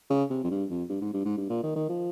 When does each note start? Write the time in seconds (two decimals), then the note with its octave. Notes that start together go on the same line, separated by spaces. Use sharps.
0.10 C#3
0.30 C3
0.44 F2
0.50 G2
0.70 F2
0.89 G2
1.01 G#2
1.13 G2
1.25 G#2
1.37 G2
1.50 A#2
1.63 D#3
1.76 D#3
1.89 F3